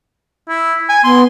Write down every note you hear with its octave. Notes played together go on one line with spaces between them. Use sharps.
E4
G#5
B3 C6